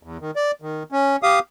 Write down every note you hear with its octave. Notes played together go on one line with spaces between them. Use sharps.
E2
D#3
D5
D#3
C#4
G4 F5 D#6